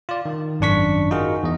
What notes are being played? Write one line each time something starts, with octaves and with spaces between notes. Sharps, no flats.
F4 D5
D#3
G#1 F#2 D4 C#6 B6
D#4 F4 F#4 G#4 A#4
E2 D#5